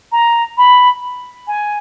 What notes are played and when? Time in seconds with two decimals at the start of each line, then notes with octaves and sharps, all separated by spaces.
0.12 A#5
0.58 B5
1.47 G#5